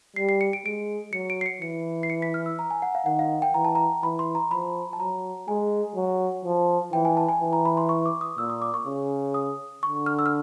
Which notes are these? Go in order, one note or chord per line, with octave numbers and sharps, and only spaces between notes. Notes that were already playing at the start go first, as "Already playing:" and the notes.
G3 C7
C7
C#7
D7
G#3 D7
F#3 C#7
D7
C7
C#7
E3 C#7
C7
C#7
B6
F6
E6
A#5
G#5
F#5
F5
D#3 F#5
F5
G5
E3 A#5
A5
A#5
E3 B5
C6
A#5
F3 B5
A5
F#3 A#5
G#3 G#5
F#3
F3
E3 G5
G#5
A5
G#5
E3
A#5
B5
C6
C#6
D6
D#6
A#2 E6
D#6
D6
C#6
C#3
D#6
D3 C#6
F6
E6
F6